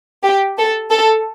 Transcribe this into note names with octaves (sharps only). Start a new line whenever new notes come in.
G4
A4
A4